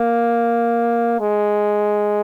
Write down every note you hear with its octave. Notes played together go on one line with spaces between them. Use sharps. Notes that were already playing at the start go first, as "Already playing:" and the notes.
Already playing: A#3
G#3